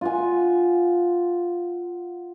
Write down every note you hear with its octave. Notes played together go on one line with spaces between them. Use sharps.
F4 F#5 G#5